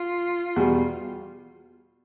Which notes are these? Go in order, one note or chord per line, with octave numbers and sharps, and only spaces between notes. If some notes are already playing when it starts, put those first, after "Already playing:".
Already playing: F4
E2 B2 G3